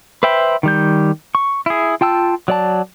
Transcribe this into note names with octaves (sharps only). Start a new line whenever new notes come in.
B4 C5 E5 G5 B5
D#3 G3 G6
C#6
E4 G#4
F4 G5 A5 E6
F#3 D5 A5